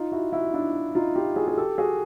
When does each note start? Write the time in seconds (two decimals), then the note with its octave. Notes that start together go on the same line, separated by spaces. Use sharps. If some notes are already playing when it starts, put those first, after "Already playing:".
Already playing: D#4 F4
0.12 E4 F#4
0.32 E4 F#4
0.54 D4 E4
0.95 D#4 F4
1.15 F4 G4
1.36 F#4 G#4
1.48 G#4
1.57 G4 A4
1.78 F#4 G#4